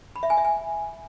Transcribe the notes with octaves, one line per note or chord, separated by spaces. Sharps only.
B5
E5
G#5
E5
G#5